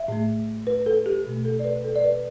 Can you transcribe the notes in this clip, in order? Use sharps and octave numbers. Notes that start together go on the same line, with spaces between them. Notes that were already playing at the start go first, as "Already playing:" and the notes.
Already playing: E5
A2 A3
B4
A4
G4
B2 A3 G4
A4
D5
B4
A4
D5
B4